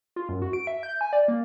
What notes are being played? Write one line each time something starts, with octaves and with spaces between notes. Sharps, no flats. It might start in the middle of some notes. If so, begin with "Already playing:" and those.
F4
F#2
F#4
D7
E5
G6
G#5
D5
A#3